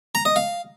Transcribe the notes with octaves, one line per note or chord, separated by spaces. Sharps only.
A#5
D#5
F5